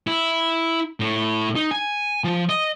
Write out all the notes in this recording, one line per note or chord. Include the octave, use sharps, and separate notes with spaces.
E4
A2
D#4
G#5
F3
D#5